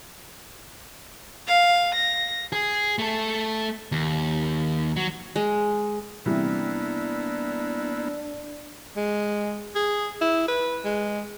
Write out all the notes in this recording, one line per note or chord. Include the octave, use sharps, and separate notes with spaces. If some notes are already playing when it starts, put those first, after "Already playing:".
F5
A#6
G#4
A3 A4
D#2
F#3
G#3
C3 E3 G3 A#3 B3 D4 E4
G#3
G#4
E4
B4
G#3